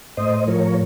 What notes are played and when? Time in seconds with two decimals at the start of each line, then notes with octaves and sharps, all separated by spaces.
0.17 A2 C5 D#5
0.47 F3 A#4 C#5